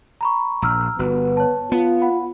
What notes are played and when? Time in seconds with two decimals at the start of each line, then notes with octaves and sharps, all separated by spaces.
0.21 A#5 B5 C#6
0.62 A#1 A#5 E6 F6
0.99 G1 B3 F#4
1.37 C#5 A5
1.72 B3 F4
2.02 F5 F#5 B5